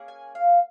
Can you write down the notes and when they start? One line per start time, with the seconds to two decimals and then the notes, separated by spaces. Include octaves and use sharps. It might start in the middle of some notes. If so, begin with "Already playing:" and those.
Already playing: A#3 C#4 G#4
0.08 G#5
0.35 F5